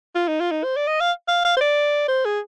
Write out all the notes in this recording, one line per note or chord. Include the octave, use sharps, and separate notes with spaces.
F4
D#4
F4
D#4
C5
D5
D#5
F5
F5
F5
C5
D5
C5
G#4